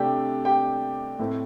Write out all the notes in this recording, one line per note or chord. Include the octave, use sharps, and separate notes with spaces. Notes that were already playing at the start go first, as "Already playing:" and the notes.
Already playing: C3 A3 D4 G4 G5
G4 G5
A2 A3 C4